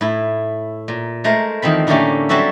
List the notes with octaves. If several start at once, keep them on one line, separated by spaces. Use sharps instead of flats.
A2 E4
A#2
G#3 A3 A#4 C5
E2 D#3 F3 C4 B5
A2 D3 A3 A#3 C#4 G4
F#3 G3 C4 F#4 A4 E5